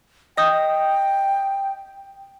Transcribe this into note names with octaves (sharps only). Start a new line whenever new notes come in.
D#5 G5 D#6 G6